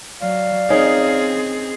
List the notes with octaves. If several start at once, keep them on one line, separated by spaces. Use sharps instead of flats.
F#3 D5 F5
C4 C#4 D#4 G#4 A#4